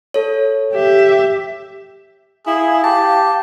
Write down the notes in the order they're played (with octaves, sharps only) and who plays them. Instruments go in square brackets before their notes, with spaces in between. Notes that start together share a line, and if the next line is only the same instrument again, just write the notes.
[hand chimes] A4 C#5
[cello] G4 E5
[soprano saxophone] E4 [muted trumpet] G#4 [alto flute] F5
[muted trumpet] G4 [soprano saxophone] A5